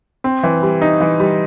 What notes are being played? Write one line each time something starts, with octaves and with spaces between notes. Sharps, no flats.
C4
E3
G3
D#4
E3
G3